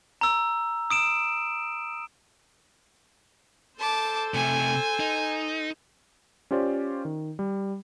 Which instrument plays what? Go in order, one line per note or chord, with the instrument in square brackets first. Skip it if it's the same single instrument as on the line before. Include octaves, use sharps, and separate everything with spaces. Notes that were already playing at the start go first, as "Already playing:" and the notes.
[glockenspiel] A#5 E6
D#6 D7 E7
[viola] A4 C5 [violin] A5 D6
[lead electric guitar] C3 A3 [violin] G#5
[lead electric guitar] D#4
[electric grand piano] C#4 F4 G4 C5 D5
D#3
G3